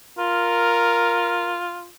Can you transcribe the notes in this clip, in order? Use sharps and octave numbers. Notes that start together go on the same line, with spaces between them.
F4 A#4